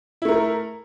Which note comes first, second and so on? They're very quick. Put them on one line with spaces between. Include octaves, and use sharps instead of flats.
E4 A3 A#4